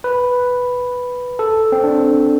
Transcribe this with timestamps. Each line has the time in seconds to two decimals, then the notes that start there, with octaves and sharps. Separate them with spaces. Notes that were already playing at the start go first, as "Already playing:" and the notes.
0.04 B4
1.39 A4
1.72 C4
1.84 D4